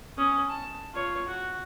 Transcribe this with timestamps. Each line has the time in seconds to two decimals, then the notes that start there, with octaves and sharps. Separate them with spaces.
0.17 C#4 D#6
0.50 A5
0.94 F4 C#5
1.27 F#4